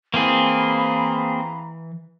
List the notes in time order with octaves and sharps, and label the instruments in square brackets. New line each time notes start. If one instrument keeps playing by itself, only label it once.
[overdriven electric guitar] E3 [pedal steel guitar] A#3 C4 G#4 [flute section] F5 A#5 B5